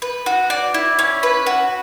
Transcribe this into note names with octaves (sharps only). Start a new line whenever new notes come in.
B4
F#4
D5
E4
C#4
B4
F#4